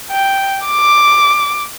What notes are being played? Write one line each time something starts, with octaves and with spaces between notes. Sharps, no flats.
G5
D6